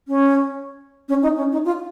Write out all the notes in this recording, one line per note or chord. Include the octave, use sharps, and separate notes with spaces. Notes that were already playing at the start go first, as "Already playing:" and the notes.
C#4
C#4
D#4
C#4
D#4
F4